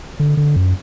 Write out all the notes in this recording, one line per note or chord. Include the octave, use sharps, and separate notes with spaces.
D3
D3
F#2